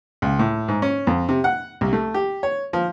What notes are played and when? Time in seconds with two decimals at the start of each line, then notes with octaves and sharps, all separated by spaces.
0.22 C#2
0.39 A2
0.68 G#2
0.82 C#4
1.07 F2
1.29 C3
1.44 F#5
1.81 C2
1.93 A3
2.14 G4
2.43 C#5
2.73 F3